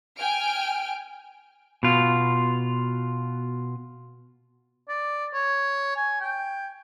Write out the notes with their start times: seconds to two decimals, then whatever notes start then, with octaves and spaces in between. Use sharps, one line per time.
0.16 G5 G#5 F6 D7
1.83 B2 F4
4.89 D5
5.33 C#5
5.96 G#5
6.21 G5